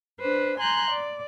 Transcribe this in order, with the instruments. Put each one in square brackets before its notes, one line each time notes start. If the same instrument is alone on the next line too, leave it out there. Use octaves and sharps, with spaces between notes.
[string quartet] D4 B4 C5
G#5 A#5 C6 F#6 G6
D5